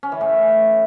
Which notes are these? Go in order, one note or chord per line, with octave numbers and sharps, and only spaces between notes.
C#4
E3
A2